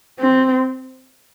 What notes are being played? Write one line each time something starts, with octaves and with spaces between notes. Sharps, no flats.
C4